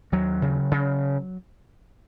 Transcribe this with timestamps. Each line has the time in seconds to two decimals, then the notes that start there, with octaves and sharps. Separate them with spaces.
0.12 D#2 F#3
0.42 C#3
0.71 C#3